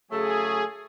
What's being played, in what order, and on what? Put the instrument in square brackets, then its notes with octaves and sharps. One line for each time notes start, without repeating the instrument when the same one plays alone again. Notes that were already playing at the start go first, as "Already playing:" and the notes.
[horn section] C#3 F#3 A3 [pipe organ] G#4